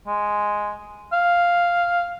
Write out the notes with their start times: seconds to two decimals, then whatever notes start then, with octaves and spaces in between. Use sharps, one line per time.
0.07 G#3
1.13 F5